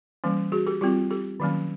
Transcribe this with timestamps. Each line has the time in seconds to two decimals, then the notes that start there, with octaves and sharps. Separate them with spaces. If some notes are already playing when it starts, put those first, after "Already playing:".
0.24 E3 G3 A#3 C#4
0.52 F#4 G#4
0.67 G4 A4
0.81 G3 C4 F4 G4
1.11 G4 A4
1.40 D#3 F#3 A#3 C#4